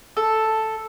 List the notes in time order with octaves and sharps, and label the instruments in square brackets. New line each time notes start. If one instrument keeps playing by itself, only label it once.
[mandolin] A4